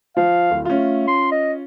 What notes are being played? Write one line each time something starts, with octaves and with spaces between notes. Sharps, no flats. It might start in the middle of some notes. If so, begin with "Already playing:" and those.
F3 F5
D1
A3 C#4 F4
C6
D#5